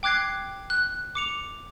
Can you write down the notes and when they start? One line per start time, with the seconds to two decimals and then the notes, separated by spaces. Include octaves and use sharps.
0.03 G5 D6 F#6 G#6 C7
0.70 F#6
1.15 D6 C#7 F7